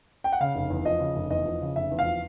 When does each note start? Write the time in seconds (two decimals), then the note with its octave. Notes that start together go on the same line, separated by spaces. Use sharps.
0.24 G5
0.32 F#5
0.40 C#3 F5
0.55 F1
0.70 E2
0.85 F3 D#5
1.00 C#3
1.16 F1
1.31 E2 D#5
1.46 F3
1.61 C#3
1.76 F1 E5
1.91 E2
1.99 F5
2.05 F3